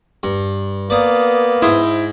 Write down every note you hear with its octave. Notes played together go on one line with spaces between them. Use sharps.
G2
A#3 B3 D5 D#6
G#2 E4 C5 D#6